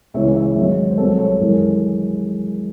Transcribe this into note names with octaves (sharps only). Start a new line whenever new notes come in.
C#2 C#3 E3 C#5 E5
C#5 E5
G#1 G#2 F#3 C#5 E5
C5
C2 C3 F#3 A4 C#5
A4 C#5
G#1 F#2 E3 G#3